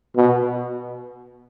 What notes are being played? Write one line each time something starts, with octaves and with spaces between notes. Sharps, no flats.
B2